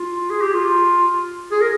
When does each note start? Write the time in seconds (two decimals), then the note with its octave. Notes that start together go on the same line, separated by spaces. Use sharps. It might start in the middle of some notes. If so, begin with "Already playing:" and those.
Already playing: F4
0.30 G#4
0.42 G4
0.54 F4
1.51 G#4
1.61 A#4